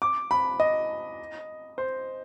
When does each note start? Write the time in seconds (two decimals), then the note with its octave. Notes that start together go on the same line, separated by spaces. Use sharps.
0.02 D6
0.31 B5
0.60 D#5
1.78 C5